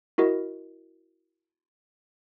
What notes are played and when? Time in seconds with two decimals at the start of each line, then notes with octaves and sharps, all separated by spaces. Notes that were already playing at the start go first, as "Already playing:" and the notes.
0.18 E4 F#4 A#4 D#5